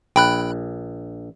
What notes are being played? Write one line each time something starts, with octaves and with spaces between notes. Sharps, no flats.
A#1 G5 B5 F#6